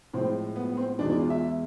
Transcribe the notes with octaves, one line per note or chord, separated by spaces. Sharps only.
A2 F3 G#3 C4
B3
B3
C4
E2 B2 G#3 D4
D4
F4
E5